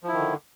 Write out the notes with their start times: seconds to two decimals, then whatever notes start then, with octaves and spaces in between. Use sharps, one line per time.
0.04 F3
0.08 E4
0.13 D#3
0.18 D3